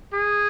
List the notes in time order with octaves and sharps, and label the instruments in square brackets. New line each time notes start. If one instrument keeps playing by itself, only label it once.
[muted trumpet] G#4